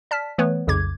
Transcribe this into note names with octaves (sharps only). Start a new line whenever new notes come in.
D5 A5 F6 B6
E3 A3 B3 B4 C#5
B1 F2 C#3 D6 G#6